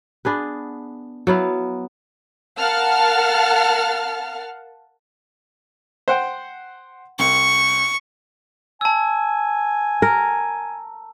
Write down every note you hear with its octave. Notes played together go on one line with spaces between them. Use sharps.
B3 D4 G#4 B4
F#3 B3 E4 F5
A#4 F5 F#5 A5 F6
C5 F#5 G5
C2 C#6
G#5 A5 E6
A#4